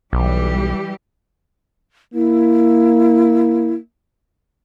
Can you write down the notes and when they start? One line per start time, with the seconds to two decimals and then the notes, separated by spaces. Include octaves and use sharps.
0.13 B1 E3 G3 G4
2.14 A#3 E4